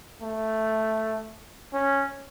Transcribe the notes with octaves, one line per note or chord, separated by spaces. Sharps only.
A3
C#4